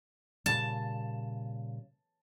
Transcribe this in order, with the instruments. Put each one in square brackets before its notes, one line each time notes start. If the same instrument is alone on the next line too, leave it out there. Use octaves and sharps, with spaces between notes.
[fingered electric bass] A#2 C#3 G3 [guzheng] A5